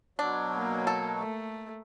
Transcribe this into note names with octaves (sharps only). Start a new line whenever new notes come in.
B2 F#3 D4
A#3
A4
A3